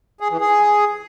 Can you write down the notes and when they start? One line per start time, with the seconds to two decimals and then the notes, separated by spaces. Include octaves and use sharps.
0.20 G#4
0.31 E3
0.41 G#4